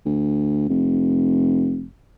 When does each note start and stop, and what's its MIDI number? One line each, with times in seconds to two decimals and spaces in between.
0.05 0.68 38
0.69 1.89 29